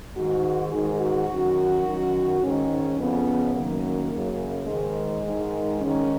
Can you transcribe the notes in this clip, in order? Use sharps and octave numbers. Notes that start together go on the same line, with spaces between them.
G#2 D#3 F#4
G#2 D#3 G#4
F#4
F#2 D#3
F#2 D#3
G#2 D#3 C#4
F2 C#3 B3
F#2 D#3 A#3
F#2 C#3
G#2 D#3 G#3
G#2 D#3
G#2 D#3 C#4